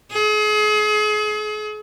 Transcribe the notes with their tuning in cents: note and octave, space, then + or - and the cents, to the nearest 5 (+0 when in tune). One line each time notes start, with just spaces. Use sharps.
G#4 +35